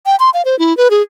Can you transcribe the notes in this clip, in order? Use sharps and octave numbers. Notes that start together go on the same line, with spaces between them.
G5
C6
F5
C5
E4
B4
G#4